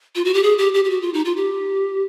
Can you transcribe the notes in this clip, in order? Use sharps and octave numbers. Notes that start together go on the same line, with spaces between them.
F4
F#4
G4
G#4
G4
G4
G4
F#4
F4
D#4
F4
G4